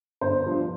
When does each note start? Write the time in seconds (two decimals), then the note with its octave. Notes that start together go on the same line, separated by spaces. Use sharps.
0.21 G1 C5
0.46 G2 F3